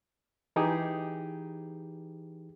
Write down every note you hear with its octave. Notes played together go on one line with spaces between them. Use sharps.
E3 D#4 G4 G#4